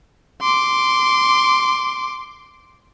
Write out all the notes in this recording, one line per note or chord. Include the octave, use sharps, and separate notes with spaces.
C6 D6